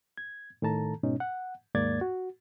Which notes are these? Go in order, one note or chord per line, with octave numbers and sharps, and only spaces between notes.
G#6
A2 D#3 A4 A5 A#5
G#2 B2 C#4 D#4
F#5
D#2 G#2 A#3 D5 G#6 A6
F#4